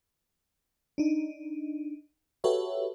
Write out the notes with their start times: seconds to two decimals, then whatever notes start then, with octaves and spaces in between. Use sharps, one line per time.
0.98 D4 D#4
2.44 F#4 G4 A4 B4 C#5 E5